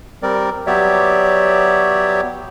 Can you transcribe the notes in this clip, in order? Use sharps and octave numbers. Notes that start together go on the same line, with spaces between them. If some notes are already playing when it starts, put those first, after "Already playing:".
G3 C4 A#4 D5
F#3 B3 G4 C#5 D5 E5